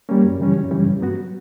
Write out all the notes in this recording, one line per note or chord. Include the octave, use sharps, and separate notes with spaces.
G3 A#3 C#4
F#2
C#3 E3 G3 C#4
F#2
C#3 E3 G3 C#4
G2
F#3 B3 F#4